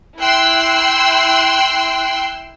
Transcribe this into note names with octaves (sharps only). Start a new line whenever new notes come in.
E4 G5 C6 E6 F#6 C7